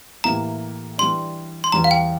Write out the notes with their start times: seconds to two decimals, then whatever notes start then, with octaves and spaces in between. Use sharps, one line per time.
0.24 A2 E3 A#3 E4 G4 A#5
0.98 E3 G3 D4 C6
1.64 C6
1.72 E2 E3 G3 A#5
1.84 F5
1.91 G5